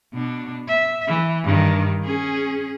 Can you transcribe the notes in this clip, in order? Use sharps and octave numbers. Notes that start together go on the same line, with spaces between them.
B2 D4
E5
E3
G2 D#3
C#4 G#4